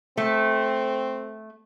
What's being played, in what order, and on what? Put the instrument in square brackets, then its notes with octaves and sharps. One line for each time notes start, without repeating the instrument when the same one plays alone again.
[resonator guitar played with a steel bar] A3 [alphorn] C4